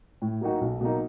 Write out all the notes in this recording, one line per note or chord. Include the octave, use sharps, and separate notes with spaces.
A2
F#3 A#3 D#4 F#4
B1
B2 F#3 A#3 D#4